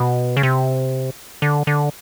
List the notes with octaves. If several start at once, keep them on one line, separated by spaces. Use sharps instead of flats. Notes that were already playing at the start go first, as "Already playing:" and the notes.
Already playing: B2
C#3
C3
D3
D3